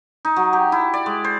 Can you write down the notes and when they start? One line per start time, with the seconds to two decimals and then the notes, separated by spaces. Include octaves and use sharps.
0.25 D#4
0.36 F#3
0.53 G4
0.72 E4
0.94 D5
1.06 G#3
1.24 C5